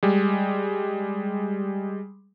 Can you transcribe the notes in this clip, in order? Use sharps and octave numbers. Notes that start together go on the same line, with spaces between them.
G3 G#3